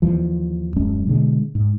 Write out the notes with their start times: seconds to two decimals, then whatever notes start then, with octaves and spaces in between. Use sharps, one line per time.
0.02 D#2 E3 F3
0.76 D#1 F#2 G#3 C#4
1.07 B2 D3 G#3
1.55 G#2